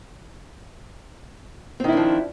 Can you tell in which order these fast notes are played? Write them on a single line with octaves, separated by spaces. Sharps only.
C4 D#3 E4 D4 F3